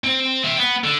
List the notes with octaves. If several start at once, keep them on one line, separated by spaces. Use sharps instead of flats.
C4
E5 G5
B3
D3